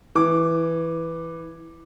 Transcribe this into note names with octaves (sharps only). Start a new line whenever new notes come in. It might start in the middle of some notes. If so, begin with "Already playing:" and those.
E3 D6